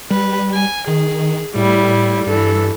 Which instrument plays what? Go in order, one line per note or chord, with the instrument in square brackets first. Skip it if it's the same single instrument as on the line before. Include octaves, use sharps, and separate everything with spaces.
[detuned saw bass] G3 [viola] B4
[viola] G#5
[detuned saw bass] D#3 [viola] G#4
[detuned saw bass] A2 [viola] G3 E4
[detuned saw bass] G2 [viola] E3 A4